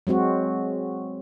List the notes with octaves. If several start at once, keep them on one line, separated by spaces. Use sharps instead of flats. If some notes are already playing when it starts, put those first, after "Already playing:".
F#3 G#3 C4 F#4